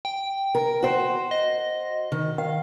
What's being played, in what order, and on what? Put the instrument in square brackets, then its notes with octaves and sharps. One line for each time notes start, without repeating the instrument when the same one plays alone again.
[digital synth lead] G5
[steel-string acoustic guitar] A#4
F#4 C5
[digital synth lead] D#5
[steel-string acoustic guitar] D#3
[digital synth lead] D#3 [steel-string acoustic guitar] F5